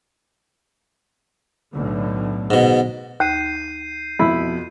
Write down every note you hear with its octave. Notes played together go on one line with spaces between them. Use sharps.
B1 A2 D3
G#2 B2
D#2 G6 C7 D#7
F2 B2 F3 E4 B5